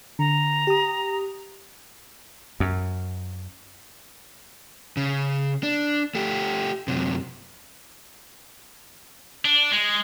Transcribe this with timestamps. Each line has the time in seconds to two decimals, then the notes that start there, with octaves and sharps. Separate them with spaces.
0.19 D3 A#5
0.67 G4 D#6
2.60 F#2
4.97 C#3
5.63 D4
6.15 A3 G4
6.88 F#2 C3
9.45 D4
9.72 G#3